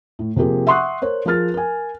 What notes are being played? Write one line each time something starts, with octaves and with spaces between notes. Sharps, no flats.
A2
C3 F3 A#3 G4 G#4
E5 F#5 C6 C#6 D#6 F#6
A#4 C5 C#5
F3 G#4 A#4 F6 A6
A#4 G#5